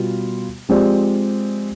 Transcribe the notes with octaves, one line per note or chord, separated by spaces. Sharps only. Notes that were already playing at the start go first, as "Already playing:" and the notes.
Already playing: B2 G3 B3 F4
F3 G#3 C4 G4 D5